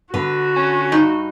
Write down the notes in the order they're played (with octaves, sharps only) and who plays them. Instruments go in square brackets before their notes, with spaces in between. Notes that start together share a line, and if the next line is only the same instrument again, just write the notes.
[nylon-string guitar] D3 [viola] F#4 [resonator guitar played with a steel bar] B4
[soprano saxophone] C#4
[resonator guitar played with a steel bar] G2 D#4